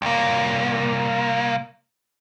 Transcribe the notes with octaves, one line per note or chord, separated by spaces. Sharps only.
C2 A#3